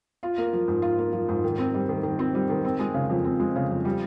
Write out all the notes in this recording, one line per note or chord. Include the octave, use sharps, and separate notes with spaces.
F4
A#3
F3
G#2
F4
A#3
F3
G#2
D#3
C4
G3
D#3
D#3
C4
G3
D#3
C4
G#3
C#3
F2
C4
G#3
C#3
F2
G3